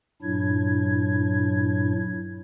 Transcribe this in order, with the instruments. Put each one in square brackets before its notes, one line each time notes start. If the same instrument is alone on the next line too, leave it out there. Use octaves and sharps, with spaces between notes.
[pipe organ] G2 A#2 F#3 D4 E4 G#6